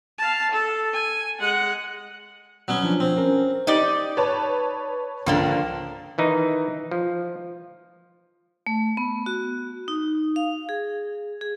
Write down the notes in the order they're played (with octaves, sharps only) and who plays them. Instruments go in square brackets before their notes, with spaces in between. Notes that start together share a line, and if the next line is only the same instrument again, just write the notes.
[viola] F5 A5
A4
G#5
G#3 F#5
[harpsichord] F#3 B3 C#4
[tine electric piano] F3 D4
[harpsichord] C4
[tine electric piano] C#4 A#4
[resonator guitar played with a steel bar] D#4 G4 D5
[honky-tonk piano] B4 C#5 A5
[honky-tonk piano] C#2 D3 [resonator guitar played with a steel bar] F3 A#3 D4
[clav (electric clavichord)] D#3 E3 D#4
F3
[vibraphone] A3
B3
F#4
D#4
F5
G#4
G#4